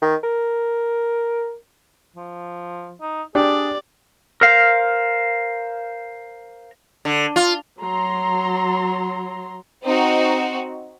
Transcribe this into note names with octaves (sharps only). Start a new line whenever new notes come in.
D#3
A#4
F3
D#4
D4 G4 G#4 D5
A#4 C5 F5
D3
F4
F#3 A#5 C6
C4 D#4 F#4